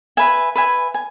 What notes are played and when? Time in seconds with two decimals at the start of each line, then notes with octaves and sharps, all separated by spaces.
0.17 B4 E5 G#5
0.55 B4 E5 G#5
0.94 G#5